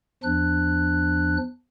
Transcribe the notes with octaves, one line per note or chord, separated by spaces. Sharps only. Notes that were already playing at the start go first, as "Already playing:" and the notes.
E2 F3 D4 F#6